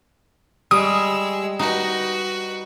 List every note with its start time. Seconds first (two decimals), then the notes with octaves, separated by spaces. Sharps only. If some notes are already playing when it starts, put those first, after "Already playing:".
0.71 G3 G#3 D#6 E6
1.59 D#4 F#4 B4